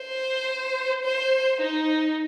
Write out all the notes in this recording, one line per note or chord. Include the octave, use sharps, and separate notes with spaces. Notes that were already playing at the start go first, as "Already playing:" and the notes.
Already playing: C5
C5
D#4